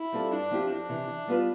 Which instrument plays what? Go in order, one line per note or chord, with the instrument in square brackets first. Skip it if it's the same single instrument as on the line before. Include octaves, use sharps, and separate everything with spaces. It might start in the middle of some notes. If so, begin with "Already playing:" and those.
Already playing: [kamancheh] E4
[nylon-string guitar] G3 C4 F4 A4
[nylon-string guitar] G2 [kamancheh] D4
[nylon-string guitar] F3 C4 E4 G4
[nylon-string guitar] F2 [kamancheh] D4
[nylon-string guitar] C3 E3
E3
G3 B3 F4 B4